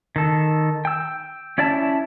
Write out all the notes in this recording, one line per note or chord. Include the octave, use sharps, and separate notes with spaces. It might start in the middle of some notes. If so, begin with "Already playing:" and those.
D#3 A4
G5 E6
C#4 E4 D5 E5 A5